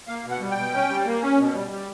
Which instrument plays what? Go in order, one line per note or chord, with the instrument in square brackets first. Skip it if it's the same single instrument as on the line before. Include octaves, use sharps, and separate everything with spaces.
[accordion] A#3 F5
B2
F#5
G3
G5
B2
C#4
G3
A#3
C#4
B2
G3
G3